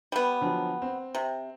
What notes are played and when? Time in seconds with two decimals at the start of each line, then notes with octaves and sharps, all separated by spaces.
0.12 G3 B3
0.41 D3 F3 F#3
0.82 C4
1.15 C3